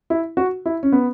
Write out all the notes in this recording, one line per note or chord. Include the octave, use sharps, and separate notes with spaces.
E4
F#4
E4
C#4
B3